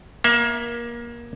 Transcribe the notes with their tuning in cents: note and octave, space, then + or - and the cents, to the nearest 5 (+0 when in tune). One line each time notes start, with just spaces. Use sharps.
A#3 +25 E5 +0